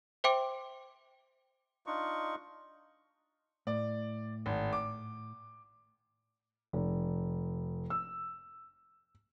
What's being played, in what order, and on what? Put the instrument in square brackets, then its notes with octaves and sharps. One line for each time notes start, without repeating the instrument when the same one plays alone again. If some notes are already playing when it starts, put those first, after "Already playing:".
[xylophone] C5 E5 G5 C6 D6 D7
[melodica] D4 D#4 F4 C#6
[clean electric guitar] A2 [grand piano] D5
[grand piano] G#1
D6
[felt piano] F1
E6